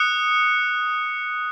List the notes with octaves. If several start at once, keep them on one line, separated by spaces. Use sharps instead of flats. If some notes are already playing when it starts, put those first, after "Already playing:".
Already playing: D#6 F#6 C#7